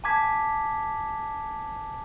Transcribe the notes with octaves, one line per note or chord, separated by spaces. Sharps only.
G#5 A5 D6 G#6 B6